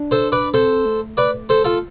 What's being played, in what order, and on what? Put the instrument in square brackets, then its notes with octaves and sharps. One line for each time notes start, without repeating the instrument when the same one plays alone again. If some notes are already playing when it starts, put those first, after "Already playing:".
Already playing: [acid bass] D4
[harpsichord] A4 C5
B4 D5
[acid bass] C4 [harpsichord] A4 C5
[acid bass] A3
[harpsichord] B4 D5
A4 C5
F4 A4